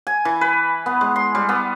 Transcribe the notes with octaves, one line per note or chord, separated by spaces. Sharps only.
G#5
E3
B4
B3
G#3
C6
G3
B3